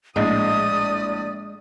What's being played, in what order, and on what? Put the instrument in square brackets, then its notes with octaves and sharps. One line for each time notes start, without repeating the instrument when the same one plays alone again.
[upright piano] A#1 A2 [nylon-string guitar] G#3 [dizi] D5 [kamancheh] D#6